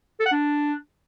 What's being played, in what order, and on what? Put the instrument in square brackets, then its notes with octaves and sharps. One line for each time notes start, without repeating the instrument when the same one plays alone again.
[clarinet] A4
F#5
D4